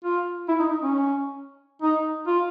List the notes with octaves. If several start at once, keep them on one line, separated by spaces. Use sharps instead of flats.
F4
E4
D#4
D#4
C#4
D#4
F4